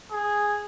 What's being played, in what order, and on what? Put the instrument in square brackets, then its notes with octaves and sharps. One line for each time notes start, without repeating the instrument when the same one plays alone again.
[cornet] G#4